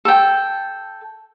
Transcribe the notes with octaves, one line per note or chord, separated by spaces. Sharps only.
A4 G5